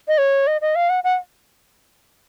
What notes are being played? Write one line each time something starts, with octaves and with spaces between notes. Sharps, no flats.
D#5
C#5
D#5
D#5
F5
F#5
F#5